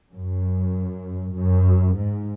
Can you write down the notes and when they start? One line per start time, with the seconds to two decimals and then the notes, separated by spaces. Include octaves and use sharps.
0.10 F#2
1.33 F#2
1.95 G#2